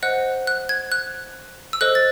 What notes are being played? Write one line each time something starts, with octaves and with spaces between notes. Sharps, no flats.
C5 D#5 F#5 F#6
F#6
G#6
F#6
E6
A4 C5 D#5 F#6
A6